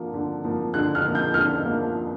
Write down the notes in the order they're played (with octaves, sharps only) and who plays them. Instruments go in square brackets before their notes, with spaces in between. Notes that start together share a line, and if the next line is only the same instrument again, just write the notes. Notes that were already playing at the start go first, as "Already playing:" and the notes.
Already playing: [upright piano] D3 F3 A#3
D3
F3 A#3
D3 F#6
F6
F3 A#3
G6
D3 F6
F3 A#3